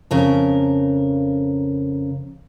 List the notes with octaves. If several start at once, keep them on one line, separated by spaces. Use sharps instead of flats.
F2 C#3 A#4